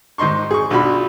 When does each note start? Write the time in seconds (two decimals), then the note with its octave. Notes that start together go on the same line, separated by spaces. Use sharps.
0.18 G#2 D#3 D#4 C6 C#6
0.51 G#4 C#6
0.70 B1 D4 F4 F#4 B5